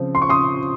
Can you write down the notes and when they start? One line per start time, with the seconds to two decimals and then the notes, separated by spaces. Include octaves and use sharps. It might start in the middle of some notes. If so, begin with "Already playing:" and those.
Already playing: C#3 F3 C4
0.15 C6
0.22 C#6
0.29 C6 D#6